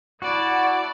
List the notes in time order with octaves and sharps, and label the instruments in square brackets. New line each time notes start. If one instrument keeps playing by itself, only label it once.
[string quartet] E4 D5 A5 [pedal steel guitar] F#4